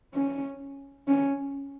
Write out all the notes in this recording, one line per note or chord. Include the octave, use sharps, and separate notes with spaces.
C#4
C#4